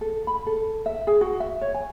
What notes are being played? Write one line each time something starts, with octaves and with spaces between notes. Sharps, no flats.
A4
B5
A4
E5
G#4
F#4
E5
C#5
G#5